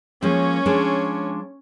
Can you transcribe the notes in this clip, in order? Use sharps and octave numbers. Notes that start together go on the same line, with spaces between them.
F3 G#3 A#3 C#4 C#5
F3 G#3 D4